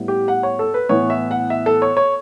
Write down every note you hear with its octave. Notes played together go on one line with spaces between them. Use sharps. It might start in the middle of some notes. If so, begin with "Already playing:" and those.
Already playing: A2 G3 B3
G4
F#5
C#5
A4
B4
A2 E3 B3 C#5
E5
F#5
E5
A4
C#5
C#5